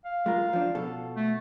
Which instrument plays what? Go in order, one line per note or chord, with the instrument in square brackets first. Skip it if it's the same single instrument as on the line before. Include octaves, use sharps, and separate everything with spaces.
[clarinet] F5
[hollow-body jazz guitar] G#3 F4 A#4
F3 D4
B2 A4
[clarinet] A3